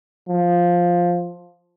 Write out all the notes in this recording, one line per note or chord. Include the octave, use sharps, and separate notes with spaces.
F3